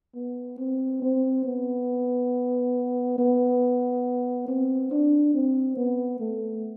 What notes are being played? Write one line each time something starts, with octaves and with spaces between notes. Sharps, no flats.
B3
C4
C4
B3
B3
C4
D4
C4
B3
A3